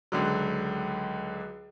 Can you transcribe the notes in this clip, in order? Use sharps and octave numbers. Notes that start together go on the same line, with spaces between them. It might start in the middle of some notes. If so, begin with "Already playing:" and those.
C#2 D3 F#3